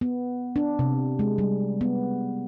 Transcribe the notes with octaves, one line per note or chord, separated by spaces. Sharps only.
B3
D4
C3
G#3
G3
B3